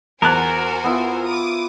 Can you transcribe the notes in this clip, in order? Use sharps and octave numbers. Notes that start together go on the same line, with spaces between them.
E2 F#4 A#4 C5 G#5 A5 F#6
B3 E4 F4
D6 D#6